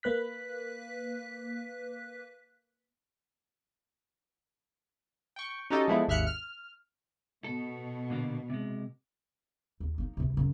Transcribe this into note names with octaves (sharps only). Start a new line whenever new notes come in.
A#3 B4 F#6 B6
G5 C#6
C#4 D#4 F#4 G4 A4 D#5
F3 G#3 A3 B3 E4
G#1 D#2 E5 F6 F#6 C#7
F6
B2 A4
A#2 D3 A#3
C3 G#3
D#2
A#3 D#4
C3 E3
F#2 C#3